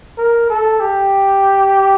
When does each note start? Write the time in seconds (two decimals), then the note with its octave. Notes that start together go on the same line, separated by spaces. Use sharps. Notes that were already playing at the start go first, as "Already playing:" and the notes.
0.18 A#4
0.50 A4
0.80 G4